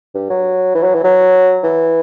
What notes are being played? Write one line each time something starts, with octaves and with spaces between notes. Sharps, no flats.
G2
F#3
E3
F#3
E3
F#3
E3